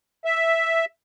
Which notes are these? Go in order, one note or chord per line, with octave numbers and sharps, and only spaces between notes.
E5